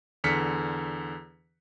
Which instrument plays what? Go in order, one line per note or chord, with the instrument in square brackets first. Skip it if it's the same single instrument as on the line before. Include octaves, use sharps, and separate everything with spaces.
[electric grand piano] E2 D3 F6 B6 C#7